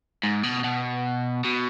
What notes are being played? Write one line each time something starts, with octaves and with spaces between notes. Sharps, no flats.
G#2
B2
B2
B2